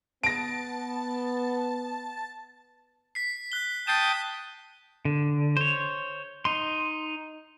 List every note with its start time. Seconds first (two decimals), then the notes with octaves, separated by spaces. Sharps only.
0.23 B3 A5 A#6 D7
3.15 B6 C7
3.52 F#6 G7
3.87 G5 A5 D#6 C7 E7
5.05 D3
5.57 C5 C#5
6.45 D#4 C6